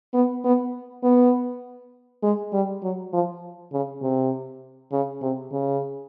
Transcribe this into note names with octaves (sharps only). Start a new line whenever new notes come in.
B3
B3
B3
G#3
G3
F#3
F3
C#3
C3
C#3
C3
C#3